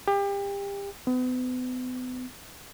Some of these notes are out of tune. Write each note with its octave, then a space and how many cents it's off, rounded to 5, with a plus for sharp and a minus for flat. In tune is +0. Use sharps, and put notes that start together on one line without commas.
G4 +30
B3 +40